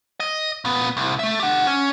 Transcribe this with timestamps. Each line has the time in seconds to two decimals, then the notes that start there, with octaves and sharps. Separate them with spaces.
0.20 D#5
0.65 A#2 B3
0.97 C2
1.19 A3 E5
1.40 G4 F#5
1.67 C#4